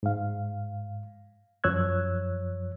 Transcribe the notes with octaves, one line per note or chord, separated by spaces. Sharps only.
G#2 F5
F#2 F3 C#5 E6 F#6 G#6